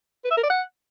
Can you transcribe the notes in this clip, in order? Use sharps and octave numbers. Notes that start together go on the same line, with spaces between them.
B4
E5
A#4
D5
F#5